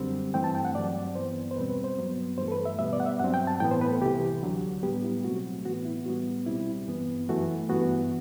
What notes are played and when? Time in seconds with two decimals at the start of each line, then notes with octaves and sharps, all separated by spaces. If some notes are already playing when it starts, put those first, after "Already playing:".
Already playing: F#2 D3 G3 C4
0.34 G2 E3 A3 C4 G5
0.44 A5
0.55 G5
0.65 F#5
0.75 G2 F#3 C4 D5
1.15 G2 E3 B3 C5
1.51 C5
1.56 E2 B2 G3 C4 B4
1.70 B4
1.84 C5
1.98 G2 F#3 B3
2.38 G2 E3 A3 C5
2.48 A4
2.52 B4
2.65 E5
2.79 B2 G3 B3 E5
2.93 D5
3.00 F#5
3.06 E5
3.20 G2 F#3 C4 F#5
3.34 G5
3.47 A5
3.60 A2 E3 B3 G5
3.71 C5
3.81 B4
3.92 A4
4.01 C2 C3 E3 G4
4.43 D2 D3 F#3
4.83 A2 G3 B3 G4
5.04 E4
5.24 B2 F#3 A3 C4 F#4
5.66 A2 E3 B3 F#4
5.85 E4
6.06 A2 G3 B3 F#4
6.46 C2 B2 G3 C4 E4
6.88 G2 E3 B3
7.29 F#2 E3 A3 F#4
7.69 G2 E3 B3 F#4